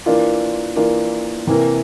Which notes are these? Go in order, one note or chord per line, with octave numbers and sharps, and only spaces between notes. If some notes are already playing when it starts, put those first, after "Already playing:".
E3 A#3 D4 F4
E3 A#3 D4 F4
C3 E3 A#3